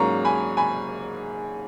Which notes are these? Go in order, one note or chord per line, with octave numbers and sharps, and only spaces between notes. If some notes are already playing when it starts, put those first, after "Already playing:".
Already playing: G#2 F#3 A#3 C#4 A#5 C#6
G#5 B5
G#5 B5